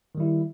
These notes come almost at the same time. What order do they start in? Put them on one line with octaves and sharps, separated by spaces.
D#3 G3 E4